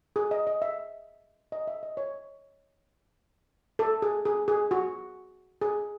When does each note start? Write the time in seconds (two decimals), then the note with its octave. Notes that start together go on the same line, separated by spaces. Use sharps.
0.16 G#4
0.31 D#5
0.47 D#5
0.62 E5
1.52 D#5
1.67 E5
1.83 D#5
1.97 C#5
3.79 A4
4.02 G#4
4.25 G#4
4.48 G#4
4.71 F#4
5.61 G#4